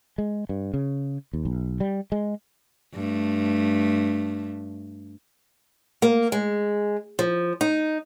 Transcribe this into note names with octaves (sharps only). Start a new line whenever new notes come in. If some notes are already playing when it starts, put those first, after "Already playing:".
G#3
G2
C#3
D#2
B1
G3
G#3
G2 A3
A#3
G#3
F3
D#4